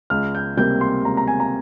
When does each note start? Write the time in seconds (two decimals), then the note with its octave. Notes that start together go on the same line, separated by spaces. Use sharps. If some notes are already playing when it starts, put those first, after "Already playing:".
0.10 C#2 F6
0.35 G6
0.57 C3 G3 A#3 G6
0.81 C6
1.04 C#2 A#5
1.17 A#5
1.28 G#5
1.40 A#5